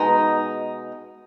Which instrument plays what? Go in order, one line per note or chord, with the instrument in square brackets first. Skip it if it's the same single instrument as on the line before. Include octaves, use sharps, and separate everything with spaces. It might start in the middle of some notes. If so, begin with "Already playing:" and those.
Already playing: [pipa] B2 G#3 D#4